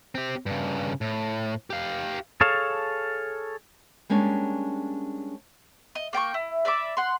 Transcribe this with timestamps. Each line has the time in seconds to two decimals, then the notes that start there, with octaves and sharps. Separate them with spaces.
0.15 C4 G4
0.46 G2 C#3
1.01 A2
1.70 G4 F5
2.41 G#4 A4 C#5 F5 A5
4.10 G3 G#3 A#3 C#4 D4
5.95 D#5
6.13 A#3 G5 A5 C#6
6.34 E4
6.65 D5 E5 B5 D6
6.97 F#5 C6